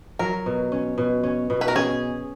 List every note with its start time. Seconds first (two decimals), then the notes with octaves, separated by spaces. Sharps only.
0.19 F#3 A#4
0.46 B2
0.72 C#4
0.98 B2
1.24 C#4
1.50 B2
1.61 B4
1.68 A#4
1.75 C#4 G#4